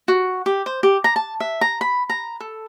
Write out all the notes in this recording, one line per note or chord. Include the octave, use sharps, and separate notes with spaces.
F#4
G4
C5
G4
A#5
A5
E5
A#5
B5
A#5
A4